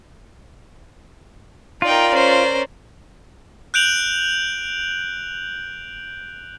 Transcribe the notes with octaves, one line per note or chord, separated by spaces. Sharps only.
D#4 F4 A#4 D5 G5
C#4 C5
F#6 G6 D7 F7 F#7